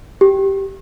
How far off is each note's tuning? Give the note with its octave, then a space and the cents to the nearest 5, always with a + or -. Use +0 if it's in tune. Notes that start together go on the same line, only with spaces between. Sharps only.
G4 -10